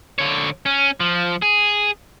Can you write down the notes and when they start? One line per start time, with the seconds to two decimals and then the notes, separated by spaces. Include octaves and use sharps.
0.19 D3 C#5
0.66 C#4
1.00 F3
1.42 G#4